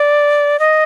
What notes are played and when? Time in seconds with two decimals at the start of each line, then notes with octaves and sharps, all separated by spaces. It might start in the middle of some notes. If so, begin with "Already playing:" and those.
Already playing: D5
0.59 D#5